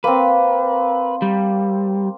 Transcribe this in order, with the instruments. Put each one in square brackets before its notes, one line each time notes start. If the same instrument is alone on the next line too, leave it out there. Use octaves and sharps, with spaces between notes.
[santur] A#3 C4 [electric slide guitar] B4
[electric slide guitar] G3